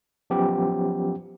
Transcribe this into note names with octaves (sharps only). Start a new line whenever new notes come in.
F3 F#3 B3 C#4 G4